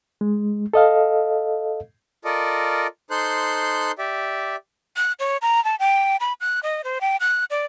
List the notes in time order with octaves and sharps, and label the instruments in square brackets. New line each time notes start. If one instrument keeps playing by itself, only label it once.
[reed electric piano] G#3
A4 D#5 F5
[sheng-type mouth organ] F4 A4 A#4 D5 D#5
D#4 A4 C5 C6 F#6 G6
G4 D5 E5
[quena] F#6
C#5
A#5
A5
G5
B5
F#6
D#5
C5
G5
F#6
D5